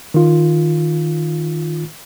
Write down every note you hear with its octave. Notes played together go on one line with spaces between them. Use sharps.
D#3 F4